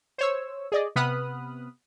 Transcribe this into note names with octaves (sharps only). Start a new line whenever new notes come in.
C5 C#5 E6
G#4 D5 D#5
C3 B3 B5 D#6 F6 F#6